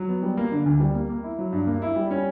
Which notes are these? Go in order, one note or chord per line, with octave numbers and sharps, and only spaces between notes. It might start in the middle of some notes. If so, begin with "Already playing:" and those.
Already playing: F#3
B3
G3
A#3
D3
D2
G3
A#3
A#3
E4
F#3
G2
A#3
E4
G3
C#4